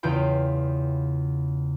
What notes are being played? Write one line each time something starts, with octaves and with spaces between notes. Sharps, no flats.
E2 C#3 F4 G5 B5